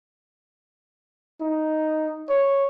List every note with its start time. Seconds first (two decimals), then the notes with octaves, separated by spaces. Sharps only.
1.41 D#4
2.29 C#5